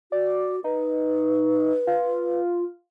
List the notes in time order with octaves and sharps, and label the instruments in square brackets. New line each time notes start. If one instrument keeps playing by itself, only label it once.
[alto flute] F#4 [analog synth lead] D5
[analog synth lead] D#4 [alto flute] B4
[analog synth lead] F4